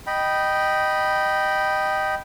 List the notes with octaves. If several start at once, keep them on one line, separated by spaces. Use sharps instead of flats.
D#5 G5 B5